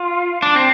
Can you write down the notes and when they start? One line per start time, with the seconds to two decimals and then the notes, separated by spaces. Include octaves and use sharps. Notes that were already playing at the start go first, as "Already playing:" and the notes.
Already playing: F4
0.42 D4
0.55 C4